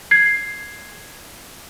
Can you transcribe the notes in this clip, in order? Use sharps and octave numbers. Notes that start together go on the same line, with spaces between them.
G#6 C7